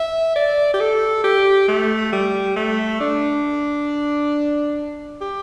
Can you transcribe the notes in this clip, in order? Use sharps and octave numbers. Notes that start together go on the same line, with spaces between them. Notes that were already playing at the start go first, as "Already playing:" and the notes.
Already playing: E5
D5
G4
A4
G4
A3
G3
A3
D4
G4